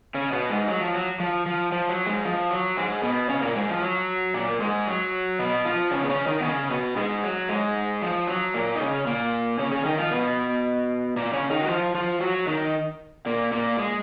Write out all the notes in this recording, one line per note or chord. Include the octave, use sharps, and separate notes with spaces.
C#3 C#4
B2 B3
G#2 G#3
F#3
F3
F#3
F3
F3
F3
F#3
G#2 G#3
F3
F#3
G#2 G#3
B2 B3
C#3 C#4
A#2 A#3
G#2 G#3
F3
F#3
A#2 A#3
G#2 G#3
F#3
B2 B3
F3 F4
C#3 C#4
B3
C#3 C#4
D#3 D#4
B3
C#3 C#4
B2 B3
G#2 G#3
F#3
G#2 G#3
F3
F#3
A#2 A#3
D#4
C#3 C#4
A#2 A#3
C#3 C#4
C#3 C#4
D#3 D#4
F3 F4
B2 B3
A#2 A#3
C#3 C#4
D#3 D#4
F#4
F3 F4
F3 F4
F#3 F#4
D#3 D#4
A#2 A#3
A#2 A#3
G#3